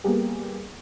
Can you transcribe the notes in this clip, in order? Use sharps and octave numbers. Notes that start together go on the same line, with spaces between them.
G3 A#3 B3 G4 G#4